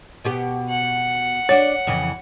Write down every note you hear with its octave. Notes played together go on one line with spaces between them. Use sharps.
B2 B3 G4
F#5
D4 F#4 C#5 D5
F2 C#3 E3